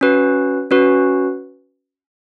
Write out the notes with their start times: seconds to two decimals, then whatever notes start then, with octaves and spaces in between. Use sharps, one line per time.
0.01 C#4 F#4 B4
0.71 C#4 F#4 B4